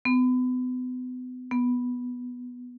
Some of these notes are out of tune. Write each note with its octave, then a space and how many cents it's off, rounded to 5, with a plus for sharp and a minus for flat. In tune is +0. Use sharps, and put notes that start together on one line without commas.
B3 +35
B3 +0